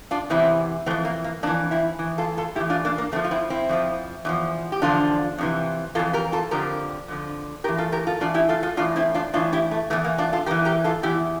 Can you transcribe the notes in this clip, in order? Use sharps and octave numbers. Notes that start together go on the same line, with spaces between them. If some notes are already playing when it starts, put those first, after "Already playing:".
D4 F4
E2 C3 E3 C4 E4
F2 E3 A3 C4
A#3
A#3
F2 E3 A#3 D4
C4 E4
A2 E3
F4 A4
F4 A4
A2 E3 E4 G4
D4 F4
A#3 D4
A#3
F2 D3 F3 A3 C4
F4
C4 E4
C4 E4
F2 D3 F3
E2 D3 F3
G4
E2 D3 F3 D4 F4
F2 C3 E3
F2 C3 E3 F4 A4
G4 A#4
F4 A4
F2 D3 F3 G4 A#4
F2 D3 F3
A2 E3 G4 A#4
F4 A4
G4 A#4
F4 A4
A2 E3 D4 F4
E4 G4
F4 A4
F4 A4
A2 E3 D4 F4
C4 E4
D4 F4
A2 E3 D4 F4
E4 G4
A3
E2 E3 A3
A#3
D4 F4
F4 A4
E2 E3 G4 A#4
G4 A#4
F4 A4
E2 E3 E4 G4